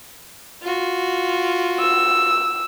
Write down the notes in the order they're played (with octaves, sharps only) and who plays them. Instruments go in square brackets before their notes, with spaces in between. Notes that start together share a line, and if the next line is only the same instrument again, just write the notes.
[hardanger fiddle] F4 F#4
[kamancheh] E6